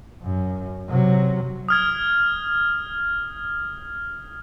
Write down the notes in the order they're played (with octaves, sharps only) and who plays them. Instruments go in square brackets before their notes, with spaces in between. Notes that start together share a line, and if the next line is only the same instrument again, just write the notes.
[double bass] F#2
C3 F#3
[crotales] D#6 F6 G#6